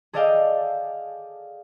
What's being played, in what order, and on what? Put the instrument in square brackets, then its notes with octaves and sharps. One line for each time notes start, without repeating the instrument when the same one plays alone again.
[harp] G#4 A4 D5 D#5 F5 G5